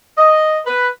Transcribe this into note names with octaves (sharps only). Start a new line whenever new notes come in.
D#5
B4